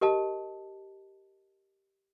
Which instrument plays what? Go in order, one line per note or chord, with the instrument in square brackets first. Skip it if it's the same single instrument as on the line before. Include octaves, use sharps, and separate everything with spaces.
[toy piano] G4 A#4 D#5 A5